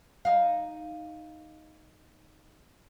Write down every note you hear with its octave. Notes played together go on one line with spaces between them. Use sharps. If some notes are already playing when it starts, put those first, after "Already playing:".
D#4 F5